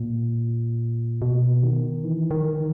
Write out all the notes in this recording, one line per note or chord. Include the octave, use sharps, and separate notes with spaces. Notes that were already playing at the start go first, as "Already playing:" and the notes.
Already playing: A#2
B2
D#3
E3
D#3